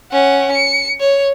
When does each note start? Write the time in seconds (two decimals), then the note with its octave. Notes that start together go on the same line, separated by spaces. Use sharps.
0.12 C#4 F#5
0.52 C#7
1.00 C#5